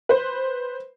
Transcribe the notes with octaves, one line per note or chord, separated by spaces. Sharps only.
B4 C5